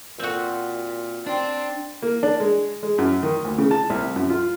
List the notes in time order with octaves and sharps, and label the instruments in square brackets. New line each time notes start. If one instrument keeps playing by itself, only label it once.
[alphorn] A#2 [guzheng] C4 F#4
[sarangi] C4 [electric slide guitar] D4
[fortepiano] A#3
D4
G#3
G#3
F#2
D#3
D2
C#3
A5
C2
F#2
F4